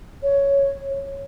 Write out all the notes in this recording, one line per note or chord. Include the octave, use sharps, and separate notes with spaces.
C#5